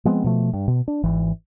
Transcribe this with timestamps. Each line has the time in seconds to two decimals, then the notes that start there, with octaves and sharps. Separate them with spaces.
0.05 F3 G#3 B3 C4
0.24 B2 F3 A3
0.53 G2
0.68 B2
0.88 D4
1.03 G#1 E3